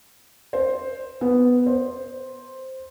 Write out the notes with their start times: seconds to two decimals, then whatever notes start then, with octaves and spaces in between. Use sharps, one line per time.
0.53 C5
1.21 B3
1.66 C5